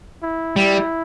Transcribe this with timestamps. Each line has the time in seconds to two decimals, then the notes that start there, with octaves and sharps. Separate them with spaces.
0.23 E4
0.56 G3 E4